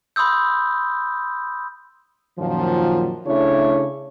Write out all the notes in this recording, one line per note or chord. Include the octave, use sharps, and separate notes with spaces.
B5 C6 D#6 E6 G6
F#2 A#2 D#3 F3
C#3 A3 D4 E4 C#5